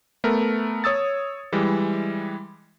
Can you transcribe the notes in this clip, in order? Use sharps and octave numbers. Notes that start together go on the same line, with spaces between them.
A3 B3 A#4
C#5 D#6 E6 A6
E3 G3 G#3